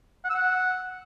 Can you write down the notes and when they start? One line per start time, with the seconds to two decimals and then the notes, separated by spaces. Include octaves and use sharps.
0.24 F#5
0.30 E6
0.35 F#5